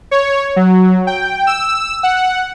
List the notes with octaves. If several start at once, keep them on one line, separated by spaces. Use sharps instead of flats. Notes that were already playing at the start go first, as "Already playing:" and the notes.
C#5
F#3
G5
E6
F#5